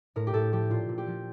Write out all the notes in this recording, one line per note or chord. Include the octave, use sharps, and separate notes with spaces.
A2 A#4
G4
A2 A4
F3 G4
A#2 F4
A#2
G4
F3